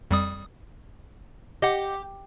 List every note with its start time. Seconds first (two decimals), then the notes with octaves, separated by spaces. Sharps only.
0.11 F2 G3 D#6
1.62 G4 D#5 F#5